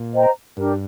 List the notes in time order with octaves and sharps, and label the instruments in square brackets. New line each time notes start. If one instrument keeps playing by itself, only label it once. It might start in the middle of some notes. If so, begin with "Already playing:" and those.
Already playing: [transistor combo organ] A#2
[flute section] C5 D#5 G5 A#5
[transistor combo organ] G2 [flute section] D4 G4 A#4